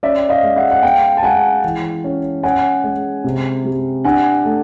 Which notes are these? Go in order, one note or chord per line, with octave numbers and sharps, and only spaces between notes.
C#4 D5 E5
D#5 F5
G#3
E5 F#5
F#5
B3 F5 G5
A5
G#3 F#5 G#5
E3
C#4
C#4 F#5 G#5
G#3
C3
G3
D4 F#5 G#5
A3